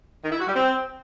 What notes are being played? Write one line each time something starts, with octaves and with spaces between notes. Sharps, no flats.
D#3
E4
F#4
G3
C4